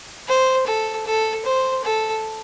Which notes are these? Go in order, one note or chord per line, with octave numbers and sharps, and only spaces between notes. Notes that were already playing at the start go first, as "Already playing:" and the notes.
C5
A4
A4
C5
A4